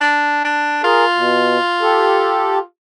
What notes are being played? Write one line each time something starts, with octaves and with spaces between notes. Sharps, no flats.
D4
D4
F4 G#4 A#4
B2
G4 A4